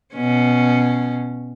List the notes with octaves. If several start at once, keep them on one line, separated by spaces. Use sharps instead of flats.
B2 C#4